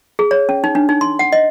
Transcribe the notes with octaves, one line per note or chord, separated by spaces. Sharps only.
G#4
C#5
C#4
D#4
D4
D#4
C6
F#5
D#5